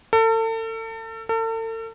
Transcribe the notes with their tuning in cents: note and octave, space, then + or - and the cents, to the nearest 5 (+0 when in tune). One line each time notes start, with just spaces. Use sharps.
A4 +35
A4 +40